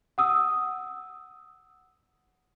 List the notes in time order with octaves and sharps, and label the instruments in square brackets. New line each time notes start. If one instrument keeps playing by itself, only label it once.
[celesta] F#5 D#6 E6